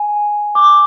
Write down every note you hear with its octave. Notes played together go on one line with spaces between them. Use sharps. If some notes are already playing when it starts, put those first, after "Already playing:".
Already playing: G#5
D6